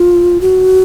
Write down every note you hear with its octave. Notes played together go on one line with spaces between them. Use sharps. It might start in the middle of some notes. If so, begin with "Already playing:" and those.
Already playing: F4
F#4